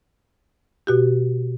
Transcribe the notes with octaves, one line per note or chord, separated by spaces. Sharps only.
B2 F#4 G4